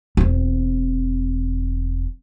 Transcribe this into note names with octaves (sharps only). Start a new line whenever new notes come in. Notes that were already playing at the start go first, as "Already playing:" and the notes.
E1 C4